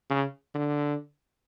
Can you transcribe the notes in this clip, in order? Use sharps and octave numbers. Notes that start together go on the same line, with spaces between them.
C#3
D3